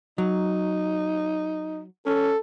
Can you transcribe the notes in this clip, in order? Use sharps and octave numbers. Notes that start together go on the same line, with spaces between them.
F#3 D#4
C#4 A4